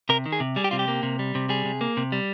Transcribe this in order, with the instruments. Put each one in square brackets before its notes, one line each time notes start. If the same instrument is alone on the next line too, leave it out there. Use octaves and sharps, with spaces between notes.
[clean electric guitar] C3 A#4
D#3
G#4
C3
G3 G#4
G4
C3 F4
G4
A#3
C3
G3
C3
G3 G#4
C3
A#3
C3
G3